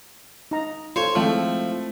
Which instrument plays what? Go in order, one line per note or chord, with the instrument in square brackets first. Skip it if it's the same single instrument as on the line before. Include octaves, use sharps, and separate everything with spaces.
[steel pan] D#4 A#5
[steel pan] F4 A4 [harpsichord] C5 C#5
[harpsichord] F3 [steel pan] G#3 [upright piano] A3 C4 E4